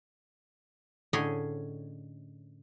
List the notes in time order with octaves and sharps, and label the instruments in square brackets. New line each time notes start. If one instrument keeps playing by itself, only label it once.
[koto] A2 D3 C#4 G#4 D#5 G#5